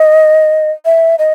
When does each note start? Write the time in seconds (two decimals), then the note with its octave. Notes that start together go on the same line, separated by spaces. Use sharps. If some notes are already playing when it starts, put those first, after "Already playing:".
Already playing: D#5
0.85 E5
1.19 D#5